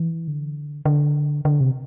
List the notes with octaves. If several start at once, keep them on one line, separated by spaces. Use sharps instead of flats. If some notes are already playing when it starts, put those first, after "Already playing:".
Already playing: E3
D3
D3
D3
C3